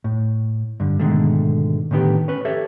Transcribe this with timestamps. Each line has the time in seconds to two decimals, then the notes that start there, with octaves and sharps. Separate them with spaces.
0.04 A2
0.80 G2 D3
1.00 G#2 B2 D3 D#3 G#3 A3
1.91 A2 D3 D#3 B3 G4
2.28 C#4 B4
2.45 G4 A4 C#5 E5